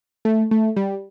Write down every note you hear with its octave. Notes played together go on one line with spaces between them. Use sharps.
A3
A3
G3